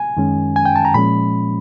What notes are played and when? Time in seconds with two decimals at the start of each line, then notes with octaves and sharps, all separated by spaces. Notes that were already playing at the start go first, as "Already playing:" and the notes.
Already playing: G#5
0.17 F#2 D#3 G#3 C#4
0.56 G#5
0.66 G5
0.76 A5
0.85 A#5
0.94 A#2 F3 G#3 C#4 B5